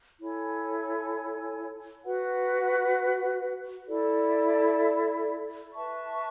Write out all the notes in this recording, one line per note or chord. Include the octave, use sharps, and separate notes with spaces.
E4 A4 C#5 G#5
F#4 B4 F#5
E4 A4 D5
B4 E5 A5 C#6